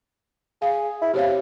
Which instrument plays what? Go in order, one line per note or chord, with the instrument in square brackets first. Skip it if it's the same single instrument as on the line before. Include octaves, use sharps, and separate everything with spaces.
[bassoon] G#4 [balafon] F5
[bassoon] E4
[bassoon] C3 [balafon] G4 C#5 F5